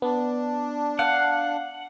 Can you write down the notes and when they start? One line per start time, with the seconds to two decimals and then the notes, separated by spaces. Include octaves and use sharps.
0.02 B3 D4
0.99 F5 F#5